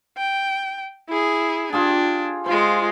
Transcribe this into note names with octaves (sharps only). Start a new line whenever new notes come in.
G5
E4 G#4
D4 F4 G4 G#4
G#3 F4 C5